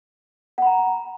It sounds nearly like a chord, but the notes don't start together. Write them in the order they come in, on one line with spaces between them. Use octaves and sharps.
F#5 B5 A#5